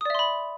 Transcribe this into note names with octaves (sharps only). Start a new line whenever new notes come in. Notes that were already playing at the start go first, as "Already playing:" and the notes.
D5 E5 B5 C6 D#6